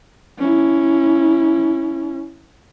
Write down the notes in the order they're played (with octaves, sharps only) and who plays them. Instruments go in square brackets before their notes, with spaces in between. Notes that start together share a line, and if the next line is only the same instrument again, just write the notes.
[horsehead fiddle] C#4 E4